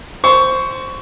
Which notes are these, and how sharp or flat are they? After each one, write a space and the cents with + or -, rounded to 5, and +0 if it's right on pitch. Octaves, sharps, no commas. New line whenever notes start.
C5 +0 C#6 +15